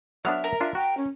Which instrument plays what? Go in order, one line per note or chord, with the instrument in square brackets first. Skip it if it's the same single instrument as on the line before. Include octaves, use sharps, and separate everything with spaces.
[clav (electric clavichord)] F#3 B3 D4 [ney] E5 [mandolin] F6
[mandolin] A#4
[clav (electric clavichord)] D4 F4 [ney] E5
[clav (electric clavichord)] F#4 [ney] G5
[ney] C#4